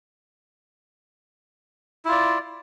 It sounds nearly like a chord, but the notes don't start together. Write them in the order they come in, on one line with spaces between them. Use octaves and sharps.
E4 F4 D5